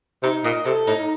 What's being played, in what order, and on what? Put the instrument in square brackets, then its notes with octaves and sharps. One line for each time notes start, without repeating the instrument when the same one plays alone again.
[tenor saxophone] C3 [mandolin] D#4
[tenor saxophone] A#2 [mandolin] D#5
[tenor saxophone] C3 [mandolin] A4
[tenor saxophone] A2 [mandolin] D#4